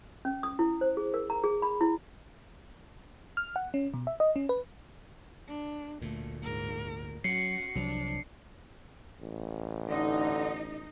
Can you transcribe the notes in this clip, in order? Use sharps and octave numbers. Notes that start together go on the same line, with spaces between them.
C#4
D#6
E4
C5
G#4
A#4
A#5
G#4
B5
E4
F6
F#5
C#4
B2
E5
D#5
C#4
B4
D4
D2 A#2 A3
G#2 A#4
F#3 C#4 F#4 C7 C#7
C2 F3 F#3 D4
A1
D3 D#4